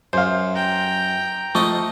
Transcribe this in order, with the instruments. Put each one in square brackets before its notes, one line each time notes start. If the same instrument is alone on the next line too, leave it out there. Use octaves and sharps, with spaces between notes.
[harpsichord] F#2 [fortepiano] C5 F5
[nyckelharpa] G5 A#5
[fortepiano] F3 C#6 [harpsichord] A3 D#5